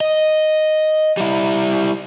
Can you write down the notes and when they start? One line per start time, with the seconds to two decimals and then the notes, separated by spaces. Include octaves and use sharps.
0.01 D#5
1.17 G3 E4